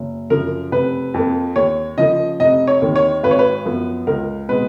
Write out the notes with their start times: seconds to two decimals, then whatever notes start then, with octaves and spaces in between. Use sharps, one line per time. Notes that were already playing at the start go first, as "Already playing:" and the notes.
Already playing: F#1
0.30 F#2 C#3 F3 A#4
0.72 F1 B4
1.14 F2 F3 A#3
1.56 D#2 C#5
1.98 C#3 F3 A#3 D#5
2.40 F1 D#5
2.67 C#5
2.82 D#2 D#3
2.96 C#5
3.23 G#1 B4
3.31 C#5
3.39 B4
3.65 F#2 F3 B3
4.07 C#2 A#4
4.48 B2 G#3 B3 B4